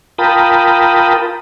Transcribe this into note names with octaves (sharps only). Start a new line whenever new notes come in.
F4 A#4 G5 A5 B5 D#6